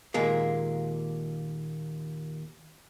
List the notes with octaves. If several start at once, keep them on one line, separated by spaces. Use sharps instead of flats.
D#2 A#2 G#3 A#3